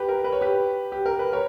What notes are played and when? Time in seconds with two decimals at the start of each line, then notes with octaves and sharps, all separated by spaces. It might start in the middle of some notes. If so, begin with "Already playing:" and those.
Already playing: G4 B4
0.09 A#4
0.24 B4
0.32 C#5
0.41 G4 B4
0.92 G4
1.06 A#4
1.19 B4
1.33 A#4 C#5